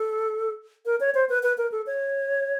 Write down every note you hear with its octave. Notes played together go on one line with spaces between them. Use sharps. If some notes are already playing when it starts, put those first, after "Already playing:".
Already playing: A4
A#4
C#5
C5
B4
B4
A#4
A4
C#5